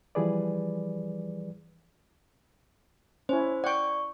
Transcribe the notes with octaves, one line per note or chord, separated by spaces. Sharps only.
E3 F3 G3 G#4 B4 D5
C#4 E4 C5
D5 F#5 G5 C#6